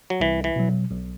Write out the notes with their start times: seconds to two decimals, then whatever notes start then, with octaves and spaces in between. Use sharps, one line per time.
0.10 F#3
0.20 C2 E3
0.44 E3
0.56 B2 F#3
0.91 B1